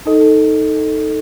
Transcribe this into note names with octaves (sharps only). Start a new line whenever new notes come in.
D#4 A4 D#5